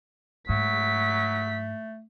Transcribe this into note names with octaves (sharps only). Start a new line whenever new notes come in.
G#2 F#3 A3 B6